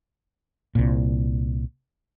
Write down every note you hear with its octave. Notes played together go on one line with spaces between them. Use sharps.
C2 A#2